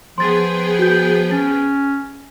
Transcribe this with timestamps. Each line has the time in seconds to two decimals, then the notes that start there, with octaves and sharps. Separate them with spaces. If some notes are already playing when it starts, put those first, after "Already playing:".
0.18 F3 B3 G#4 G5 C6 A6
0.79 F#4 G6
1.31 C#4 A6